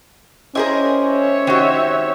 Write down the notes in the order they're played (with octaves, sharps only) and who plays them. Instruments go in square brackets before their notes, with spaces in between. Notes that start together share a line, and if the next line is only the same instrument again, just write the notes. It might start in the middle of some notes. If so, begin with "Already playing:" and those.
[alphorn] C#4 [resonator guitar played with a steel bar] E4 G#4 A#4 [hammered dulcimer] G4 C5 D#5
[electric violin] C#5 E5
[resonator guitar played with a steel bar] D#3 G4 [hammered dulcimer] C4 F#4